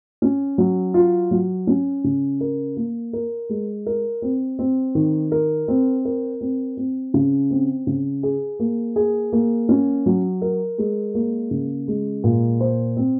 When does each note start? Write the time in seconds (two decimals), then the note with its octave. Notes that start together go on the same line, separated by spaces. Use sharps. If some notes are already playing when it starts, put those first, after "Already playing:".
0.22 C#4
0.58 F#3
0.94 F4
1.31 F#3
1.67 C#4
2.04 C#3
2.41 A#4
2.77 A#3
3.13 A#4
3.49 G#3
3.86 A#4
4.22 C4
4.59 C4
4.95 D#3
5.32 A#4
5.68 C4
6.05 A#4
6.41 C4
6.77 C4
7.14 C#3
7.51 C4
7.87 C#3
8.23 G#4
8.59 A#3
8.96 G#4
9.32 A#3
9.69 C#4
10.06 F#3
10.42 A#4
10.78 G#3
11.15 A#3
11.51 C#3
11.88 G#3
12.24 A#2
12.61 C5
12.97 C4